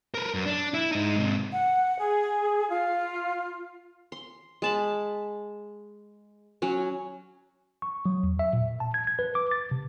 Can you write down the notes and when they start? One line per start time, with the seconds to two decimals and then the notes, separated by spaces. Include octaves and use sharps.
0.14 A#4 B4
0.34 F#2
0.46 D4
0.74 E4
0.92 G#2 D#4
1.16 G#2 C3
1.52 F#5
1.98 G#4
2.70 F4
4.12 C6
4.62 G#3 A5 B5
6.62 F#3 C#4
7.82 C#6
8.06 F#3
8.23 E2
8.39 E5
8.53 A#2
8.80 A5
8.94 G#6
9.07 G#6
9.19 B4
9.35 D6
9.51 A6
9.71 C3